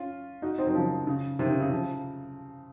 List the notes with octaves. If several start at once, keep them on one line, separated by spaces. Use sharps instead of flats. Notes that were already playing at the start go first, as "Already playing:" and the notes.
Already playing: C#4 F4
D#4 F#4
C4 D#4
D#3 F#3
C#3 F3
C#3
C3 D#3
C#3
C#3
C#3 F3